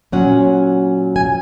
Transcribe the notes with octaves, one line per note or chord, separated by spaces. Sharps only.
A#2 F#3 C#4 F#5
G#5